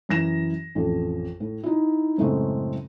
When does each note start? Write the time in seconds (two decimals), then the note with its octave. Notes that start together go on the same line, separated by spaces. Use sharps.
0.09 F#2 E3 A#6 E7
0.75 A1 F2
1.40 A2
1.63 D#4 E4
2.18 F#2 A2 C#3 G#3 A3 C4